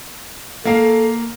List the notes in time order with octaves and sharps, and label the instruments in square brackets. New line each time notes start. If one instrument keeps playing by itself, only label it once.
[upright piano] A#3 F5 [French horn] A4